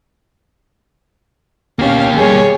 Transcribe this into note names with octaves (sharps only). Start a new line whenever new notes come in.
B2 A#3 C#4 G4 F5
G3 G#4 C#5